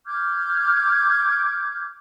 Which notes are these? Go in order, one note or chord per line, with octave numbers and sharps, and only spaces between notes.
D6 F6 G6 G#6